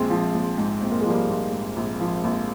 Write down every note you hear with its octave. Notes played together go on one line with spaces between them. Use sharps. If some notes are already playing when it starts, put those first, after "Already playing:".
Already playing: A#1 G#3 C4
F3
A#1
G#2
A#1 C4
A#3
F3 G#3
G3 A#3
A#1
G#2
A#1
F3
A#1